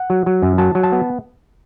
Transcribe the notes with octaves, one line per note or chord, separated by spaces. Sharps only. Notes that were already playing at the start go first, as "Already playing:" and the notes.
Already playing: F#5
F#3
F#3
F#2
F#3 A5
F#3
A5
B3